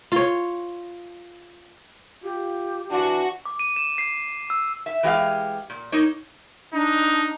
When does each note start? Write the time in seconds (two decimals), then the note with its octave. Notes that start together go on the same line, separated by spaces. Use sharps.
0.12 F4 C#5
2.24 F4 G4
2.91 E3 D4 F#4
3.45 D6
3.59 D#7
3.76 E7
3.98 C7
4.50 E6
4.86 E5
5.03 E3 G#3 G4 D#5 F5
5.70 A#2
5.92 A#3 D#4 C#5 D#5
6.74 D4 D#4